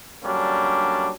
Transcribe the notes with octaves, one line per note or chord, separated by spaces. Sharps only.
D3 F#3 G3 A#3 C#4 D4